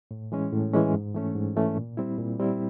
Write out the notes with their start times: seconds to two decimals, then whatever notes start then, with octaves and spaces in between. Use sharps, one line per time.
0.11 A2
0.32 E3 G#3 C#4
0.53 A2
0.74 E3 G#3 C#4
0.94 G#2
1.15 E3 A3 C#4
1.36 G#2
1.56 E3 A3 C#4
1.77 A#2
1.97 G3 C4 E4
2.18 A#2
2.39 G3 C4 E4